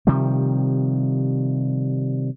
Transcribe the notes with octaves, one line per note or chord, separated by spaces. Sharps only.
C3 D#3 F3 G3